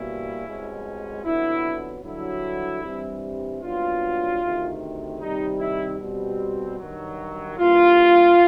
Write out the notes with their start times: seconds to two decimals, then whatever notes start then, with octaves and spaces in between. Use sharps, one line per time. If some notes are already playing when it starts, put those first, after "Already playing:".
Already playing: B2 G3 A#3 C#4 E4
0.45 C2 B2 G#3 C#4
1.25 F2 D3 F#3 B3 E4
2.04 G2 D3 F#3 E4
2.83 G2 E3 G3 C4
3.62 C2 A#2 F#3 B3 D4 F4
4.41 D2 C3 D#3
5.20 C3 D#3 G3 D#4
5.60 E4
5.99 B2 G3 C4
6.79 G2 D#3 F#3
7.58 G2 E3 G3 A#3 F4